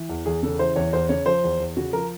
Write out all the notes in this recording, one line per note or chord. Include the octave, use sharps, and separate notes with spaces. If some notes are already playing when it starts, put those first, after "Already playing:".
Already playing: E3
E2
E2 G#4
C#3 A4
E3 C5
E2 C#5
E2 C5
C#3 C#5
F3 C5
E2
E2
C#3 F#4
F3 A#4